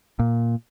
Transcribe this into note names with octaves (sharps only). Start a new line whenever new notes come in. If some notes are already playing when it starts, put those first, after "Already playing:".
A#2